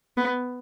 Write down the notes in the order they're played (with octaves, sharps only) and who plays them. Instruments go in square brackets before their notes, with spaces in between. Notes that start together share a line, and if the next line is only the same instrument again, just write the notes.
[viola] B3